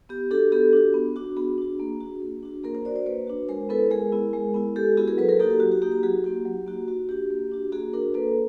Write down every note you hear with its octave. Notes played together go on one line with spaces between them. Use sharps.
B3 G4
D4 F#4 G4 A4
B3 G4 A4
D4 F#4
B3
D4 F#4
B3 F#4 G#4
D4 F#4
A#3
D4 F#4
A#3
D4 F#4
A#3 G#4 A#4
A#4 C5
D4 F#4 C5 D5
C5 D5
A#3 B4 C#5
D4 F#4
G#3 A#4 C5
B3 E4 A4 B4
G#3 G#4 A#4
B3 E4
G#3
B3 E4
G#3 G4 A4
B3 E4 F#4 G#4
G#4 A#4
F#3 A4 B4
G#4 A#4
A#3 D#4 F#4 G4 A4
G4
F#3 F#4
G4
A#3 D#4 F#4 G4
G4
F#3 F#4 G#4
A#3 D#4 F#4 G4
F#3
A#3 D#4 F#4
A#3 F#4
D4 F#4 G4
A#3
D4 F#4
A#3 F#4 G#4
D4 F#4 G#4 A#4
A#3 A4 B4